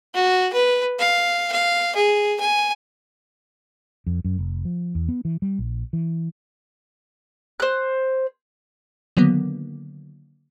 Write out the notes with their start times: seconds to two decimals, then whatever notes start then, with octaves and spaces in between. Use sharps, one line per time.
0.15 F#4
0.53 B4
0.99 F5
1.52 F5
1.95 G#4
2.40 G#5
4.07 F2
4.25 F#2
4.39 F1
4.65 F3
4.95 E2
5.08 B3
5.25 E3
5.42 G3
5.59 A#1
5.93 E3
7.60 C5 F#6
9.17 D3 D#3 F#3 A#3 B3